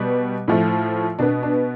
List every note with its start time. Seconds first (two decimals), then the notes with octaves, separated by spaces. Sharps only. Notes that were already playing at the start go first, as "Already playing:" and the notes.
Already playing: B2 G3 B3
0.48 A2 F3 A3
1.19 B2 B3 D4
1.43 D4